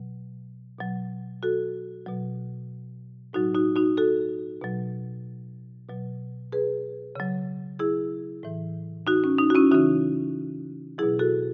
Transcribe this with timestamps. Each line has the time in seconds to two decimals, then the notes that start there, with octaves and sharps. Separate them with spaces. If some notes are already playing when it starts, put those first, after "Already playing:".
Already playing: B2 F#3
0.79 B2 F#3
1.43 F#4 A4
2.06 B2 F#3
3.33 A2 F#3 D#4 F#4
3.55 D#4 F#4
3.76 D#4 F#4
3.97 F#4 A4
4.61 B2 F#3
5.88 B2 F#3
6.52 G#4 B4
7.15 C#3 F#3
7.79 E4 G#4
8.43 A2 E3
9.07 D#4 F#4
9.24 C#4
9.38 D#4
9.50 F#4
9.55 C#4 E4
9.71 C#3 E3 D#4 F#4
10.98 B2 F#3 E4 G#4
11.19 F#4 A4